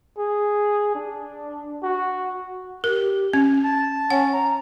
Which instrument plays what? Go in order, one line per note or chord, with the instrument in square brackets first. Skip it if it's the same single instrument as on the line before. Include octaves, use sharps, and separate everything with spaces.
[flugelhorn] G#4
D4
F#4
[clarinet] G4 [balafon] A#4
[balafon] C#4
[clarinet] A5
[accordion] C#4 [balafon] F#5
[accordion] A#5